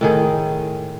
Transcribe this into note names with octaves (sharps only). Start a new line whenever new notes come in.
A2 D#3 G#4